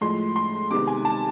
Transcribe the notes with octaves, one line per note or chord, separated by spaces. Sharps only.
A2 F3 G#3 C6
C6
C3 D#3 G#3 B3 D6
G#5
A5